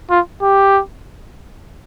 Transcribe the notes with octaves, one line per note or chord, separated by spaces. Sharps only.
F4
G4